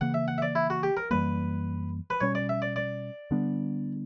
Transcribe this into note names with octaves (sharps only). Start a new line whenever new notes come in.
C#3 E3 A#3 F#5
E5
F#5
E5
D5
E4
F#4
G4
A#4
F#2 E3 G3 A#3 B4
B4
B2 G3 C#4 C#5
D5
E5
D5
D5
D3 G3 B3 D4